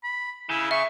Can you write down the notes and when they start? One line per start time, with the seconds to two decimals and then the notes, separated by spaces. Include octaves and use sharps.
0.03 B5
0.50 C#3 E4
0.71 E5 C#6